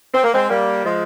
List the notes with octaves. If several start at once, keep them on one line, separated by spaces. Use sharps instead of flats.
C4
A#3
G#3 C4
G3 A#3
F3 G#3